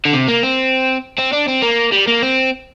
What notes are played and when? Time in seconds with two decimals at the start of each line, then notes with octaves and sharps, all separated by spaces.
0.05 D3
0.13 C3
0.28 A#3
0.43 C4
1.18 C4
1.32 D4
1.48 C4
1.62 A#3
1.92 G3
2.07 A#3
2.22 C4